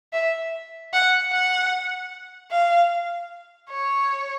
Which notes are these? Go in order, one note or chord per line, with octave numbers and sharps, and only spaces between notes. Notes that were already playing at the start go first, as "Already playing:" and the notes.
E5
F#5
F#5
F5
C#5